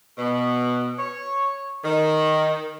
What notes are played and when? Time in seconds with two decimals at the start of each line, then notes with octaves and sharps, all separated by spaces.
0.18 B2
0.98 C#5
1.84 D#3